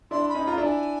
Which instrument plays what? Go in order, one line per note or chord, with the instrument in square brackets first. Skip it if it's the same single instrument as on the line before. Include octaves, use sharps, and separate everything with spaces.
[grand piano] D4 E4 [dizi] C6
[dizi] B5
[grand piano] C#4 D#4
[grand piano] F4 [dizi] A#5
[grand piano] D4 E4
[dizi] G#5